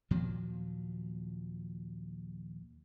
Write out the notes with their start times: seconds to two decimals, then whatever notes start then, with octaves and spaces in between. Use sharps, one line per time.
0.11 D#2 A#2 F3 F#3